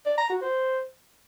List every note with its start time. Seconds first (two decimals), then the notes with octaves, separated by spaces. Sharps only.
0.06 D5
0.18 A#5
0.30 F#4
0.42 C5